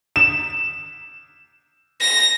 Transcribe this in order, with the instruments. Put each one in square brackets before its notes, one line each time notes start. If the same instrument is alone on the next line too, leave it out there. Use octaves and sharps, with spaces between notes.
[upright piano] E7
[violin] A#6